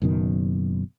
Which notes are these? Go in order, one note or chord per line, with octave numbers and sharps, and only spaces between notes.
F#1 F#2 B2 D#3